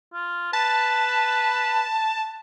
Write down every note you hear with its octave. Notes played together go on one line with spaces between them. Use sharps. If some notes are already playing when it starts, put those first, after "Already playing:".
F4
B4 A5